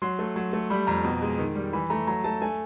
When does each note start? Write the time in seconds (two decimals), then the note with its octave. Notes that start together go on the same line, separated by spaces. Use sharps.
0.02 F#3 C6
0.19 A3
0.36 F#3
0.53 A3
0.70 G3 B5
0.87 F2 A#5
1.04 B2
1.22 G#3
1.39 D#3
1.55 G3
1.73 E3 B5
1.90 A3 A#5
2.07 F#3 A#5
2.24 A3 A5
2.41 A3 G#5